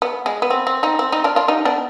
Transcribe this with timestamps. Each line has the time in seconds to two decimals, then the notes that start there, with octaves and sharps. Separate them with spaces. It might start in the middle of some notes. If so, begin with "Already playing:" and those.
0.02 B3
0.26 G#3
0.42 B3
0.50 C4
0.67 C4
0.83 C4 D#4
0.99 C4
1.12 C4 D#4
1.24 D4 F4
1.36 D4 F4
1.48 D#4 G4
1.65 B3 D4